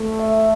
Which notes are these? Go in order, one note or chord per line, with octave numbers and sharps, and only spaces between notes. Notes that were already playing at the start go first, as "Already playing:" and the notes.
Already playing: A3
E5